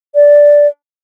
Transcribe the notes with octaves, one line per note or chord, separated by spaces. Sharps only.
D5